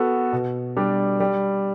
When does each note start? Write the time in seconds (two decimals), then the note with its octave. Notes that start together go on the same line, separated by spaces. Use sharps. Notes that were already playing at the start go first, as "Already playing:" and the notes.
Already playing: B3 F#4 A4
0.33 B2
0.77 G3 D4
1.20 G3